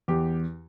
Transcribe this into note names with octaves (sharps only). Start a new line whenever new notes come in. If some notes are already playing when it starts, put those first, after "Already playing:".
E2 G4